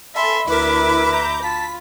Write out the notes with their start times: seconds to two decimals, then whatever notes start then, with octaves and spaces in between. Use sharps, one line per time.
0.16 A4 E5 G#5 B5 C6
0.47 D2 E4 A#4 B4 E5 D6
1.12 A#5 G6
1.43 F4 A5 B6